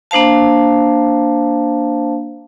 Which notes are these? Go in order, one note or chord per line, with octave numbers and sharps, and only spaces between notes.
A#3 D4 C5 F5 A5